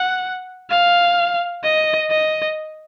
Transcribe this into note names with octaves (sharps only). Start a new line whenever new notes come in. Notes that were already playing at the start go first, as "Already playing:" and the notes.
Already playing: F#5
F5
D#5
D#5